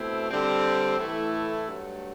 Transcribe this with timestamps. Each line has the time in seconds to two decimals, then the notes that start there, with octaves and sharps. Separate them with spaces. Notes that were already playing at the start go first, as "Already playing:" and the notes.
Already playing: B2 A3 C4 E4
0.29 D3 G3 C4
0.98 A2 E3 A3 E4
1.67 G2 F#3 A3